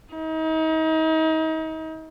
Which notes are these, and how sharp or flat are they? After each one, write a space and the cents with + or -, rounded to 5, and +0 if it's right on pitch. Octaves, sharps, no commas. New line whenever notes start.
D#4 +35